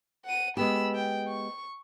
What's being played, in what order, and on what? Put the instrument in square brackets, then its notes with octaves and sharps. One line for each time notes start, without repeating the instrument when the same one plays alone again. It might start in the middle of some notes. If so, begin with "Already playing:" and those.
[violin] F#5 D#7
[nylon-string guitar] G#3 B3 G4 [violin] B5 E6
[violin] G5
C#6